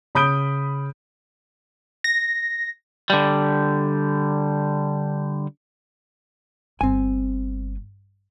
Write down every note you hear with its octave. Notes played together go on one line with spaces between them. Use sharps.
C#3 B5 D#6 G6 D7 G7
A#6
D3 G3
G1 C4 G#5